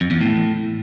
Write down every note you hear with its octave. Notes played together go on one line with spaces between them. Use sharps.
F2
E2
A2